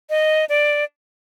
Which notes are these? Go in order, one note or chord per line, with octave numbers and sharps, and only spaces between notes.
D#5
D5